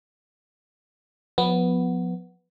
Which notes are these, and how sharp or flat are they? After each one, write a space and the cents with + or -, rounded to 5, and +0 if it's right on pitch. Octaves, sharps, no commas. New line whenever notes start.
F3 +40 B3 +0